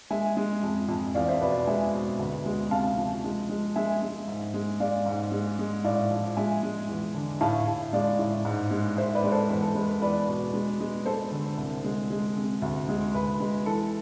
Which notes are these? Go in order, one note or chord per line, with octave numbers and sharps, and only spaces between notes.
G#3 E5 G#5
G#3
F2
F2
E2 D5 F5
C5 E5
B2 B4 D5
G#3 E5 G#5
B2
D2
G#3
C3 F5 A5
F3
G#3
G#3
G#3 E5 G#5
G#3
G#2
G#3
G#3 D5 F5
G#2
G#3
G#3
A2 D5 F5
F3
G#3 E5 G#5
G#3
E2
D3
A2 F5 A5
A2
G#3 D5 F5
A2
G#2
G#3
G#2 C5 E5
B4 D5
G#3
A4 C5
E2 B4
A4
G#3 B4
B4
E2 B4 D5
B2
G#3
G#3
G#3 A4 C5
D3
C2
G#3
G#3
C3
D2
G#3
D2 B4
G#3
E3 A4